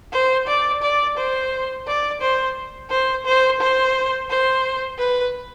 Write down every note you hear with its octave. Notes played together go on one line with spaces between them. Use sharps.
C5
D5
D5
C5
D5
C5
C5
C5
C5
C5
B4